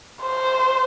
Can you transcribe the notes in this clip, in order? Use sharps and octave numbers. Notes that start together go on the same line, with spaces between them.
C5